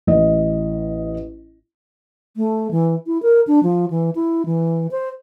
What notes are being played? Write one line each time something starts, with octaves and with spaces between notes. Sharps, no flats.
A1 D#5
A3
E3
E4
A#4
D4
F3
E3
E4
E3
C5